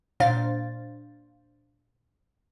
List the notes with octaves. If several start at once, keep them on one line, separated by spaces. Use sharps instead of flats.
A#2 D4 C5 F5 A6